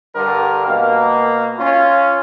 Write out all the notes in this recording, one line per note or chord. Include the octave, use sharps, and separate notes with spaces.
G2 D3 G3 G4 A#4
B2 A#3
C#4 F4